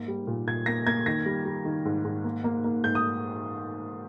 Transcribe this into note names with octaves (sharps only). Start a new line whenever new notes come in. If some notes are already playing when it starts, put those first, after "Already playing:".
Already playing: G#2 A#3
G3
A#2
A#2 G#6
A#3 A#6
A#3 G#6
D#3 A#6
G3
G3
D#3
G#2
G#2
A#3
A#3
A#3
G#2 G6
D#6